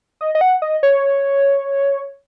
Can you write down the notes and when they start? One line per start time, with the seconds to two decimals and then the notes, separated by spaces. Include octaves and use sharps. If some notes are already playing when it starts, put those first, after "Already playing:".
0.21 D#5
0.35 D#5
0.41 F#5
0.62 D#5
0.83 C#5